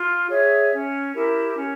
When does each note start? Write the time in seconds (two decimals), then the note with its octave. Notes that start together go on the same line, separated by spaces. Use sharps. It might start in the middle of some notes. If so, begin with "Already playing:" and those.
Already playing: F4
0.29 G#4 C#5 E5
0.72 C#4
1.14 E4 G4 A#4
1.56 C#4